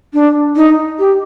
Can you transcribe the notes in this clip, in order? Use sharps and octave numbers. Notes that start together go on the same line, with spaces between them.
D4
D#4
G4